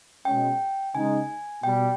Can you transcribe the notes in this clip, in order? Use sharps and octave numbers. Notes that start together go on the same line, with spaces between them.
B2 G#3 C#4 G5
C#3 G#3 D#4 G#5
B2 G3 G5